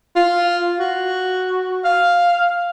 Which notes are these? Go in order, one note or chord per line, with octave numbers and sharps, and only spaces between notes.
F4
F#4
F5